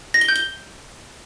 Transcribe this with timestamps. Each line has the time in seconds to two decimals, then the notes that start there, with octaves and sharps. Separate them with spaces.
0.14 A#6
0.21 G7
0.29 G6
0.36 G7